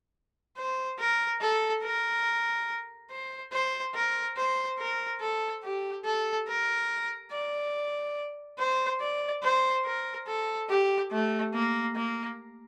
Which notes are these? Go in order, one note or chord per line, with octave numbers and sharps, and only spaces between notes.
C5
A#4
A4
A#4
C5
C5
A#4
C5
A#4
A4
G4
A4
A#4
D5
C5
D5
C5
A#4
A4
G4
A3
A#3
A#3